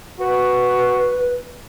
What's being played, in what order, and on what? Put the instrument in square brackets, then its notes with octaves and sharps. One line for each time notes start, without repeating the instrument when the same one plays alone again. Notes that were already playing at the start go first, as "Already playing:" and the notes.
[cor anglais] F#4 [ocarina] B4